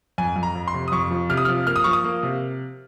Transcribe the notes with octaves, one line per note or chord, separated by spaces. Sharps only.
F2 G#5
F2
A#5
F2
C6
C3
D#6
F2 C#6
F3
C3 F6
D#6
F3 F6
A#3 F6
D#6
F3 C#6
D#6
A#3
C3